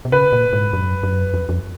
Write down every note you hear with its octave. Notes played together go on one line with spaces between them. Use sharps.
B2
C#3 B4
A#2
G#2
F#2
F#2
F2
F2